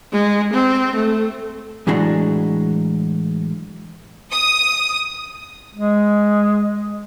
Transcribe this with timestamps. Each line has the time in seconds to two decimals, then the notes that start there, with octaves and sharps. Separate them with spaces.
0.12 G#3
0.53 C4
0.95 A3
1.87 A2 E3 F#3 G#3 D4 F#4
4.30 D#6
5.74 G#3